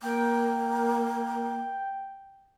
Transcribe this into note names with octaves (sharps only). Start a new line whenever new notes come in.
A#3 G5